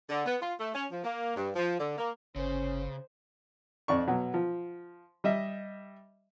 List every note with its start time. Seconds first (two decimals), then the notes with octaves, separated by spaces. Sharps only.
0.10 D3
0.26 B3
0.42 F4
0.60 A3
0.75 C#4
0.91 F3
1.04 A#3
1.36 G2
1.56 F3
1.79 D3
1.98 A#3
2.36 G1 C#3 C#4 C5
3.88 F2 D5 C#6
4.07 B2 F#3 B3
4.34 F3
5.24 G3 D#5 E5